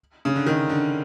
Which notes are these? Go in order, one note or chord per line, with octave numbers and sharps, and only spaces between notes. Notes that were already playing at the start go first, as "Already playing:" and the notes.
C#3
D3
D#3
D3